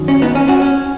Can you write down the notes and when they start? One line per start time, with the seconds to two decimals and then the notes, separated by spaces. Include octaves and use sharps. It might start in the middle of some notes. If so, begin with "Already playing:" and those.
Already playing: F#2 D#3 F#3
0.08 C#4
0.22 B3 D#4
0.35 C#4
0.48 C#4 F#4
0.62 C#4